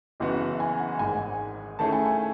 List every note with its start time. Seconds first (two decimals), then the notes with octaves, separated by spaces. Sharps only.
0.20 F#1 F#2 E3 B3 F#4 D#5
0.40 E5
0.60 G#5
0.80 F#5
0.99 G#1 G#2 D#3 G#3 G#5
1.79 D#3 A3 C#4 E4 G#4 A5
1.93 G#5
2.05 G#5